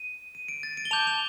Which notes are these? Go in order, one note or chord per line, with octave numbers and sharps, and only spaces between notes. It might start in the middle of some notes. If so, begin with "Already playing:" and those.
Already playing: D#7
D#7
D7
A6
D7
G7
A5 D6 G6 F7
F7